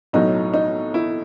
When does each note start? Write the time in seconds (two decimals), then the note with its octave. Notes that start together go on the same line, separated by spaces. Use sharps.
0.13 B1 A2 F#3 D#4
0.53 D#4
0.94 E4